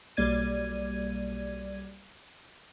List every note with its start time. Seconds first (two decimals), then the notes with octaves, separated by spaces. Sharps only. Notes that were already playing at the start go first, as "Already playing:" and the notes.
0.17 B1 G3 A#3 D5 G#6 D#7